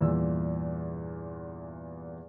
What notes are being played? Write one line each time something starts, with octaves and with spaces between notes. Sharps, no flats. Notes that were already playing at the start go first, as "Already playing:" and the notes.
E2 G2 A#2 E3 E6